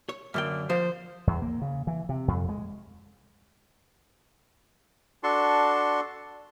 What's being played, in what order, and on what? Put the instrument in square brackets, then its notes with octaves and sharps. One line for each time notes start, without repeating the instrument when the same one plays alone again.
[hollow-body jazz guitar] C#5
[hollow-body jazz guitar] F#2 D3 G5 [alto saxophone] A#3
[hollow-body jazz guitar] F3 [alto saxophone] C5
[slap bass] E2
A#3
C#3
E3
C3
F2
G#3
[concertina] D4 F#4 A4 A5 C6 C#6